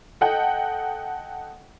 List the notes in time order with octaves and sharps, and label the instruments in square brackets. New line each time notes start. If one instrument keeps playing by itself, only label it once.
[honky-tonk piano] A4 D#5 F#5 G5